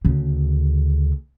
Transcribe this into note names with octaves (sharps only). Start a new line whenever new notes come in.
D2 C#3